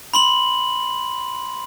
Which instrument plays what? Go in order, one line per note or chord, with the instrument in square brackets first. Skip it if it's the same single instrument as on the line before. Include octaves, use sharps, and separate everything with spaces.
[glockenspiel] B5 C6 F#7